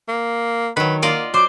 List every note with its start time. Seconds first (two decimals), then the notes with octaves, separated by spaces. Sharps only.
0.08 A#3
0.77 D#3 F#3 B4
1.02 A#3 F4 D5 D#5
1.34 F#3 C5 D6